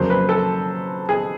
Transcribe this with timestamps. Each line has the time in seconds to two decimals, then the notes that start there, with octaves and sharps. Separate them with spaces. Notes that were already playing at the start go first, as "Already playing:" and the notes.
Already playing: F2 C#3 F#3 A#3 C#4 C5
0.10 B4
0.29 A4
1.09 G#4